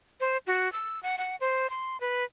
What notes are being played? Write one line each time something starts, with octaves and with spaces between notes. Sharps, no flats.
C5
F#4
E6
F#5
F#5
C5
C6
B4